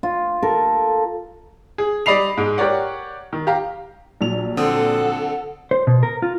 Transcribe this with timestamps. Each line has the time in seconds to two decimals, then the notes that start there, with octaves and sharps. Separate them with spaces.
0.03 F4
0.43 A4 A#4
1.78 G#4
2.06 G3 D5 D#5 B5 C7 F7
2.37 G#2 G#3
2.58 G4 A#4 C#5 D5 F#5
3.33 D#3
3.47 G4 F5 A#5
4.21 A#1 F#3 F7
4.57 D3 C4 A4 F#5 D#6
5.71 C5
5.87 B2
6.03 A#4
6.22 F4